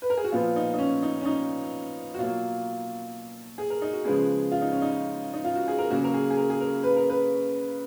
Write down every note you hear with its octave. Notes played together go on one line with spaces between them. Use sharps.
B4
A#4
G#4
F#4
A#2 F3 B3 F4
D#4
D#4
C#4
D#4
C#4
D#4
F#4
B2 F#3 A#3 F4
G#4
A#4
D#4
F#4
C#3 F3 G#3 B3 G#4
F4
D#4
C#4
D#4
D#4
F4
F#4
G#4
A#4
C#3 F#3 A#3 F#4
A#4
G#4
G#4
A#4
G#4
A#4
B4
A#4
B4